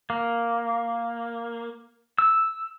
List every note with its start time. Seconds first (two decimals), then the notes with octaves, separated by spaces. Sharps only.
0.10 A#3
2.18 E6